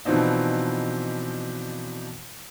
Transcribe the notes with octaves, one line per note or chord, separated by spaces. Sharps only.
B2 E3 F3 C4 D4 D#4